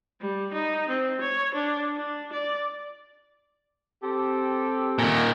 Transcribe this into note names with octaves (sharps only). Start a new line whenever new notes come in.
G3
D#4
C4
C#5
D4
D4
D5
C4 G4 A4
A#2 D#3